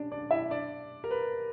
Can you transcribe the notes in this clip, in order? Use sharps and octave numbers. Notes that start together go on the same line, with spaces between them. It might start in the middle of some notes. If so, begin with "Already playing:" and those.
Already playing: C#4 D4 D5
D4 D5
E4 E5
D4 D5
A#4
B4